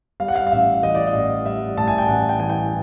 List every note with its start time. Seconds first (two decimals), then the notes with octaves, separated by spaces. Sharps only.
0.20 G3 F5
0.28 F#5
0.36 F5
0.47 F5
0.52 A1 E5
0.83 E3 D#5
0.95 D5
1.07 D#5
1.14 A1
1.46 G3 E5
1.77 A2 A5
1.88 G#5
1.98 G5
2.08 A1 F#5
2.29 G5
2.40 E3 G#5
2.49 G5